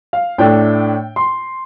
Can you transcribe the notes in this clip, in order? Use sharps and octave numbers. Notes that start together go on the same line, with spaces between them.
F5
A2 A3 D4 G5
C6